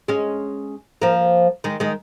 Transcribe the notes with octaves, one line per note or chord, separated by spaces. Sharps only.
G#3 C#4
F3 A#3
D#3 G#3
D#3 G#3